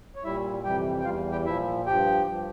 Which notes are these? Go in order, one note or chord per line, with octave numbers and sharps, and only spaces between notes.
C#5
A#2 G3 E4 E5
F2 C3 E3 G3 G4 G5
G5
E2 E3 G3 F4 F5
G4 G5
A#2 F3 E4 E5
G2 F3 G4 G5
G2 F3